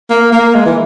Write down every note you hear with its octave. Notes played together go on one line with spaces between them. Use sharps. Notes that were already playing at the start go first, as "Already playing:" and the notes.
A#3
A#3
G#3
E3